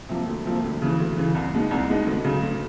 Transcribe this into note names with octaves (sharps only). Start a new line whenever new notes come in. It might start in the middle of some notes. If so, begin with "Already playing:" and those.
C3 F3 A#3
D2
C3 F3 A#3
D2
C#3 E3
D2
C#3 E3
C2
B2 G#3 B3 D#4
C2
B2 G#3 B3 D#4
D2
C#3 F#3
D2